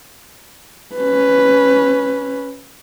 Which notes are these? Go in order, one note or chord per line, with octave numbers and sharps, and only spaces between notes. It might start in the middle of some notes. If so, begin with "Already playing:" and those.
C#4 B4